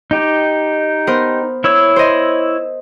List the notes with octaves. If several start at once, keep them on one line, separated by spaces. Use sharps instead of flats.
D#4 G4
B3 A#4 C5
E4 C#5 E6
C5 D#5